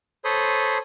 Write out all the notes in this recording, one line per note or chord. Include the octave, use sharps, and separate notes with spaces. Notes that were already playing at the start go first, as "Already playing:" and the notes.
A4 C5 C#5 B5 C6 D#6